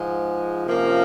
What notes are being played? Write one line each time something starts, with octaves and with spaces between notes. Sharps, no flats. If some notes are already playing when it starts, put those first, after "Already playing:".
Already playing: G#2 F3 G#3
C3 F3 A#3 C#4